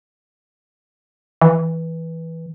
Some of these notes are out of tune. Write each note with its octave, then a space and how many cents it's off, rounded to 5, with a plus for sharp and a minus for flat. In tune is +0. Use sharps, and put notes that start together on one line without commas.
E3 -10